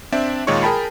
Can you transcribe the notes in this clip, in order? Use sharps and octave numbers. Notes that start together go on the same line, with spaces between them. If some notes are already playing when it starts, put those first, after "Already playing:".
C4 D4 D5 E5
A#2 D#3 G#3 F4 C#5 C#6
G#4 A#4 G5 A5 B5